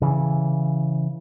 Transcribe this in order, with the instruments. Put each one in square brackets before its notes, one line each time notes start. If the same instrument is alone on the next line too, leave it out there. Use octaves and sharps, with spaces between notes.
[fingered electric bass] C#3 E3